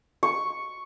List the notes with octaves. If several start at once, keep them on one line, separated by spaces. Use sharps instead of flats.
C#6